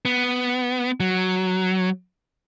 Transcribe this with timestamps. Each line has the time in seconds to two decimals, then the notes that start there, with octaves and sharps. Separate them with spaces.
0.05 B3
1.00 F#3